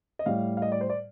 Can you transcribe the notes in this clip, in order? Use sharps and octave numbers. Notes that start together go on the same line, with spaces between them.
D#5
A2 G3 F5
F5
D#5
D5
C5
D5